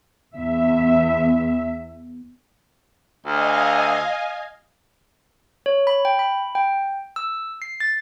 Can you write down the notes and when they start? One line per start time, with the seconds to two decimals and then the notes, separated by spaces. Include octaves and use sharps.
0.36 E2 E5
3.27 D2 D#5 F5 G#5
5.66 C#5
5.87 B5
6.05 G5
6.19 B5
6.55 G5
7.16 E6
7.62 C7
7.80 A6